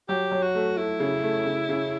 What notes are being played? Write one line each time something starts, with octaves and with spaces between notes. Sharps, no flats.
F#3 G4
F#3
F#4
A3
A3 E4
C#3
A3
C#3
C#3